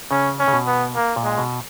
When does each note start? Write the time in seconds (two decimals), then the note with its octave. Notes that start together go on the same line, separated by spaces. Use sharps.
0.11 C#3 C#4
0.39 C#4
0.48 C#3
0.53 B2
0.67 B3
0.95 A#3
1.16 A#2
1.23 G#3
1.38 B2